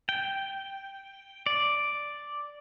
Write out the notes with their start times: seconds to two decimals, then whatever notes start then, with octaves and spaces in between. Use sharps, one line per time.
0.09 G5
1.46 D5